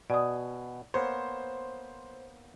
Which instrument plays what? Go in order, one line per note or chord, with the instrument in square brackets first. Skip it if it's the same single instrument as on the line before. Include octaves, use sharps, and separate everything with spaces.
[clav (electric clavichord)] B2 G#5 [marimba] D5 D#6
[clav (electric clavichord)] A#3 B3 C#5 [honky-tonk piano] C5